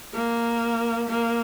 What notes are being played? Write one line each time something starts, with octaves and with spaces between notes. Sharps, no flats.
A#3
A#3